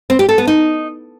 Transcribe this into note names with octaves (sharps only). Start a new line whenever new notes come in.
C4
G4
A4
B3
D#4